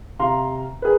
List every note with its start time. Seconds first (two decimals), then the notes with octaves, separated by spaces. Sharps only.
0.19 C3 F5 A#5 C6
0.82 G#4 A#4 B4